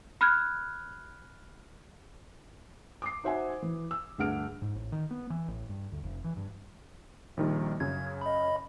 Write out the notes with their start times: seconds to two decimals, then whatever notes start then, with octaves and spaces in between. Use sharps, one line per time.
0.21 B5 F6 F#6 G#6
3.02 D6 D#6 C7
3.24 D#4 F#4 C5 E5 F#5 G#5
3.62 E3
3.91 E6
4.18 D2 G2 G#4 F#5 F6 D7
4.62 G#2
4.75 A1
4.92 D#3
5.11 B3
5.30 E3
5.48 A1
5.69 G2
5.92 D2
6.03 F1
6.24 E3
6.37 G2
7.37 A#1 D#3 G3
7.80 F#2 C#3 G#6
8.21 D#5 B5